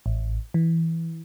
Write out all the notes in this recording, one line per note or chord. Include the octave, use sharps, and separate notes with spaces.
A1
E3